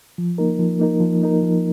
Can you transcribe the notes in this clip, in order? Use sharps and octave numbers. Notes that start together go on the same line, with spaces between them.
F3
A#3 D#4 A#4
F3
A#3 D#4 A#4
F3
A#3 D#4 A#4
F3